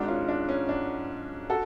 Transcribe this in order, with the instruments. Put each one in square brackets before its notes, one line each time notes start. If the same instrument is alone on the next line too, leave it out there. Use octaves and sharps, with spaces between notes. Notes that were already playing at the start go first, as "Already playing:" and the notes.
Already playing: [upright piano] G#1 G#2 D4 F#4
C#4 F4
D4
C#4
D4
F#4 A4